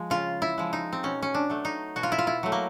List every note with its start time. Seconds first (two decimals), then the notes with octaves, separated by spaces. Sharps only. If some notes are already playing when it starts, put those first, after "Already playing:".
Already playing: F3 G#3
0.10 C#3 F4
0.42 E4
0.58 F3 G#3
0.73 D#4
0.93 C4
1.03 B2 C#4
1.22 C#4
1.34 D4
1.50 F#3 A3
1.65 D#4
1.96 B2 F#4
2.03 F4
2.12 E4
2.18 F4
2.27 E4
2.43 F#3 A3
2.52 A#3